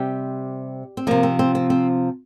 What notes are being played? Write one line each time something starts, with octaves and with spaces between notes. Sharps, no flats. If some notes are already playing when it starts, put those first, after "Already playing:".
Already playing: C3 G3 G4
C4
C3 F3 A#3
C4
C4
C4
C4